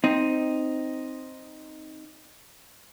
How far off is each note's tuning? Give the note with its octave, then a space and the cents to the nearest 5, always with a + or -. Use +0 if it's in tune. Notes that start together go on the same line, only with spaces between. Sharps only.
C4 +0 D#4 +0